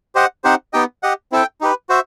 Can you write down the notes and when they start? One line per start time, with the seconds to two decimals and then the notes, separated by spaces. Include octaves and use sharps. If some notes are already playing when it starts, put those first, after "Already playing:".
0.15 G4 C5 D#5 F#5
0.44 C4 D#4 G4 C5 F#5
0.73 B3 D#4 G4 D#5 G5
1.03 G4 D#5 F#5
1.32 C4 E4 A4 E5 G5
1.61 D#4 G4 B4
1.89 F#4 C5 E5